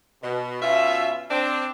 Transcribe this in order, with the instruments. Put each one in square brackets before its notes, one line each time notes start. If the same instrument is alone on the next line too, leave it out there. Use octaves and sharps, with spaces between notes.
[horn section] B2
B2 C#4 F4 E5
C4 D4